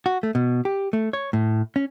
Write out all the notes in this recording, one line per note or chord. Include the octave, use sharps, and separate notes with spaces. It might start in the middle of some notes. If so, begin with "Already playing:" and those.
F#4
A3
B2
G4
A3
C#5
A2
C#4